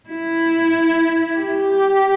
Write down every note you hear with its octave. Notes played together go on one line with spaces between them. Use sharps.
E4
G4